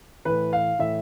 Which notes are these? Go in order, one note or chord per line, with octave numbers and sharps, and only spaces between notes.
A2 E3 B4
F5
A2 E3 E5